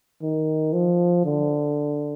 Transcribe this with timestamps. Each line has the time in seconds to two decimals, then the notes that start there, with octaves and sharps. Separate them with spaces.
0.22 D#3
0.73 F3
1.25 D3